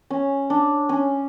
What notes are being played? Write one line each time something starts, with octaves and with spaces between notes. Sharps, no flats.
C#4
D4
C#4